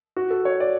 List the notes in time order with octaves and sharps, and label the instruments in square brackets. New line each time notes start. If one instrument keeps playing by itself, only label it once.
[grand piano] F#4
A4
C#5
D5